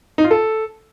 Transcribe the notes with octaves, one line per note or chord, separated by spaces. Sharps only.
D#4
F4
A4